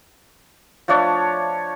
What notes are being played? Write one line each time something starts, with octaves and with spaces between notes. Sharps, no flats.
F3 A3 D4 C#5